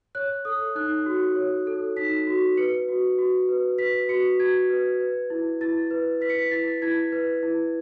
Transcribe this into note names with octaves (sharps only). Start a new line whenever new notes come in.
C#5 F#6
A4 D#6
D#4 F#6
F#4
C#5
A4
D#4 B6
F#4
B4 C#7
F#4
F#4
B4
B4 B6
F#4 C#7
F#4 G#6
B4
B4
E4
E4 A6
B4
B4 B6
C#7
B6
E4 A6
E4 G#6
B4
E4